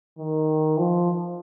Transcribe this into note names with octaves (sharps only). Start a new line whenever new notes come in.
D#3
F3